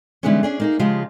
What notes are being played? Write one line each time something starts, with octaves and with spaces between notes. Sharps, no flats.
D3 E3 G3 G#3 B3 C#4
C#4 D4 G#4
A#3 D#4 G#4
C#3 F3 G#3 F4 G4